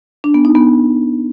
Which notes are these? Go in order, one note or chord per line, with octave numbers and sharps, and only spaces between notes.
D4
B3
D#4
B3